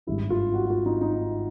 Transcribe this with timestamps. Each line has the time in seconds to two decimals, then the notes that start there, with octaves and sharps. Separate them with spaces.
0.07 G#1 G2 D#3 G#3 E4
0.30 F4
0.54 F#4
0.65 F#4
0.70 F4
0.86 D#4
1.01 D#4